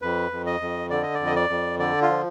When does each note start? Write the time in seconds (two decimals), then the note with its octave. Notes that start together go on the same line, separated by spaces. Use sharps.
0.02 F2 B4
0.31 F2
0.46 D#5
0.60 F2
0.90 D3 D5
1.03 D#5
1.14 D5
1.20 F2
1.27 D#5
1.36 D5
1.49 F2
1.79 D3 D5
2.02 F4
2.10 F3